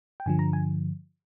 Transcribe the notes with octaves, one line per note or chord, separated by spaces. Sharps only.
G5
G2 D3 F3 G#5
A#5
G#5